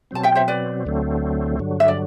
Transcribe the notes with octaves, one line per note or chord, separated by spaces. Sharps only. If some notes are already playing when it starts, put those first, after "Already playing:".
B2 F#3 C4 A5
E5 G5
C5 E5
B4 D5
D2 D3 F#3 A3 C4
G2 D3 F#3
E5
D5